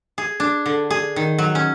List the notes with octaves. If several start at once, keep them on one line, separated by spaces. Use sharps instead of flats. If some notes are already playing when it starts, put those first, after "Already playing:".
G#4
D4
D3
G#4
D#3
F#3
C#4